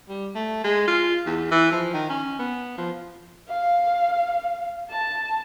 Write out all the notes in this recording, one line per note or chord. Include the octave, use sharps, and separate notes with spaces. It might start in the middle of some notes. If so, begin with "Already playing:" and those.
G3
A3
G#3
F4
E2
E3
F3
D#3
C#4
B3
F3
F5
A5